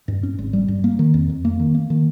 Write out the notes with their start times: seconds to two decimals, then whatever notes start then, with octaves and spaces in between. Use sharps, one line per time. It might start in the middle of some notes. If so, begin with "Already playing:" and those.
0.08 G2
0.23 C#4
0.39 G#1
0.53 G3
0.68 G2
0.84 A#3
0.99 D#3
1.14 F2
1.30 F2
1.45 A#3
1.60 D#3
1.75 A#3
1.90 D#3